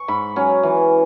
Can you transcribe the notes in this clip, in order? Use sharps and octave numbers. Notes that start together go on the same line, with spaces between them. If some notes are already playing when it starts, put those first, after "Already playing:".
Already playing: C#6
G#2 B5
F#3 C#4
E3